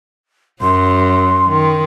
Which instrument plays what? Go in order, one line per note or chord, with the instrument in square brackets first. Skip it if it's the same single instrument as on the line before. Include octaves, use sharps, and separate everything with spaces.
[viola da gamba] F#2 F#3 [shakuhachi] C6
[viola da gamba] D#3